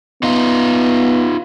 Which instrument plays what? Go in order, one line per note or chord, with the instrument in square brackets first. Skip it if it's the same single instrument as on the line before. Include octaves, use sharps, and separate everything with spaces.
[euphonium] B3 [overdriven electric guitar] D#4 F4